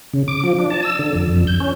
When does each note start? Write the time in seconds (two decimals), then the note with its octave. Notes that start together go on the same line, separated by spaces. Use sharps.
0.13 C#3
0.28 D6
0.44 F3
0.59 D4
0.70 A5
0.83 E6
0.99 D3
1.15 F2
1.36 F2
1.47 G6
1.60 C#4